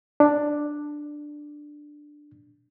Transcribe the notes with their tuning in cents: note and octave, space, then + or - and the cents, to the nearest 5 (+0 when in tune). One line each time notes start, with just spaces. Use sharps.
D4 +5